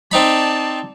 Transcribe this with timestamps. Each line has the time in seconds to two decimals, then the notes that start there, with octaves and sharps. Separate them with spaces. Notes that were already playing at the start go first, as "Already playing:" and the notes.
0.11 C4 D#4 D5 A5 B5